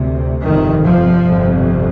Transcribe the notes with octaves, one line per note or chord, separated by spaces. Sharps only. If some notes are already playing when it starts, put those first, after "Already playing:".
Already playing: D2 C3
G1 F2 C3 D#3
F3
G1 F2 C3